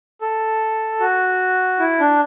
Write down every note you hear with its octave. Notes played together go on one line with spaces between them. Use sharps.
A4
F#4
E4
D4